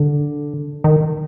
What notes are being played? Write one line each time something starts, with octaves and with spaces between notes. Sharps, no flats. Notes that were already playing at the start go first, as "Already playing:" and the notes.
Already playing: D3
D#3